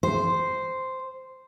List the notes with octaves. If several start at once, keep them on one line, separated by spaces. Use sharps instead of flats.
C5